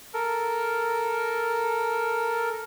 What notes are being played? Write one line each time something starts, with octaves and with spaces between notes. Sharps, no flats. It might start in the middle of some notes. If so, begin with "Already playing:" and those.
A4 A#4